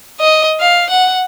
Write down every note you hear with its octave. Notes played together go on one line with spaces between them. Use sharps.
D#5
F5
F#5